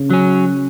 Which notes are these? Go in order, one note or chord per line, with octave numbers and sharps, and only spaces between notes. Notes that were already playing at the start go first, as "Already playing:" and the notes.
Already playing: C#3
F#3 C#4